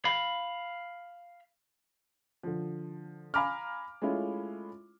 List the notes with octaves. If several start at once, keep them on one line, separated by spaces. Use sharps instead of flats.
F5 B5
D3 F3
F5 G#5 A#5 B5 D6 F6
G#3 A3 C#4 E4 F4